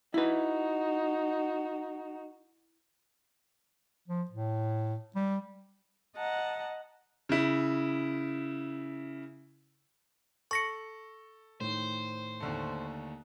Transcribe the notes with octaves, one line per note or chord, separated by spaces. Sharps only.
D#4 E4 F#4 B4
F3
A2
G3
D#5 F#5 A5 A#5
C#3 E4
A4 C#6 A#6 C#7
A2 D#3 C5
D#2 D3 A3